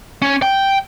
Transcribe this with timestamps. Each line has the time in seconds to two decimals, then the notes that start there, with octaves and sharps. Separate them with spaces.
0.22 C#4
0.42 G5